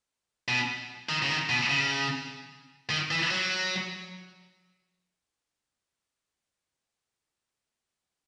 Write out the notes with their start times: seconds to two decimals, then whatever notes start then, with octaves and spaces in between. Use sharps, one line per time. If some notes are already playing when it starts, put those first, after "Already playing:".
0.48 B2
1.09 D#3
1.23 C#3
1.29 D#3
1.49 B2
1.69 C#3
2.90 D#3
3.11 E3
3.31 F#3